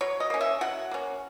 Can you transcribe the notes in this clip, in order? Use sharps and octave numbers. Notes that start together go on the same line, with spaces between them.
F#3 C#5
D#5
A#3 C#4
E5
F#3 F#5
A#3 C#4